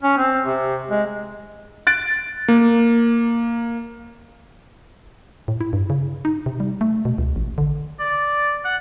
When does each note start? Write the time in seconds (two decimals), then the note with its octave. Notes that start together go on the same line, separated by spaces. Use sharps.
0.03 C#4
0.17 C4
0.45 C3
0.90 G#3
1.87 F#6 A6 D7
2.48 A#3
5.48 A2
5.61 E4
5.73 G2
5.90 C#3
6.25 D#4
6.46 C3
6.60 G3
6.81 A3
7.05 B2
7.18 C#2
7.36 A1
7.58 D3
7.99 D5
8.65 F#5